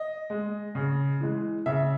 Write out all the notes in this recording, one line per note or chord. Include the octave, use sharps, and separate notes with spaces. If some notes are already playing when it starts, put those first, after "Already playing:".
Already playing: D#5
G#3
C#3
E3 G#3
C#3 E5